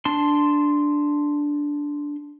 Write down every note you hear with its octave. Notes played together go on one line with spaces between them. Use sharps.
D4 A5 C6